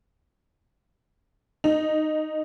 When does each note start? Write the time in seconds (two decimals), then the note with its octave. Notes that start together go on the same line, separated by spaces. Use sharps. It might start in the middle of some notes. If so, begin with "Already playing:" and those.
1.64 D#4